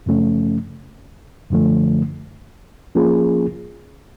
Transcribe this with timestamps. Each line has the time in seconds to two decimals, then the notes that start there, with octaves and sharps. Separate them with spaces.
0.06 F#2 C#3 F3 A3 C#4
1.50 F#2 D3 F3 A3
2.95 F3 A#3 C#4 F4 G#4